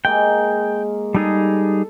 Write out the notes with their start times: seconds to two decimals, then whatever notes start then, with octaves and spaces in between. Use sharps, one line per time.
0.05 G#3 A#3 A#4 G5
1.14 G3 D#4 G#4 A4